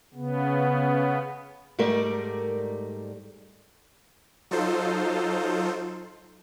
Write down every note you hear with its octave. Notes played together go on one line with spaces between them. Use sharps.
C#3 B3
G#2 G3 A3 A#4 D5
F#3 D#4 F4 A4 C5